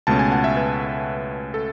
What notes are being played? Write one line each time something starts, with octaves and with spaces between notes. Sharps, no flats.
C#2 B2 A3 C#4 A5
G#5
F#5
E5
B4
A4